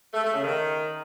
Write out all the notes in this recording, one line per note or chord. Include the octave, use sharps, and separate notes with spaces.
A3
A3
C#3
D#3